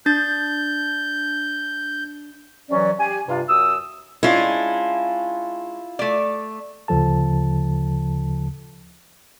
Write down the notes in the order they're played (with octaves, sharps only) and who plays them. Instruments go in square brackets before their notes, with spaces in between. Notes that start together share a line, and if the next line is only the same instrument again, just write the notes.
[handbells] D4 A6 [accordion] G6
[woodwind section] C3 E3 F#3 C#4 D5
G4 G#5
G2 C3 F4
F#2 D#6 E6
[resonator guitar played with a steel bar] G#3 C#4 D4 [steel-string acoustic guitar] E4 F4
[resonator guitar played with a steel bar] A3 D5
[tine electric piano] D2 C#3 F3 A4 A5